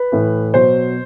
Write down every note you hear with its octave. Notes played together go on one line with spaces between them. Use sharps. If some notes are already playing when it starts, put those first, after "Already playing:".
Already playing: B4
A2 E3
B2 F#3 C5